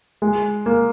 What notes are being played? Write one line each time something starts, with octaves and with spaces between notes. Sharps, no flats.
G#3
A#3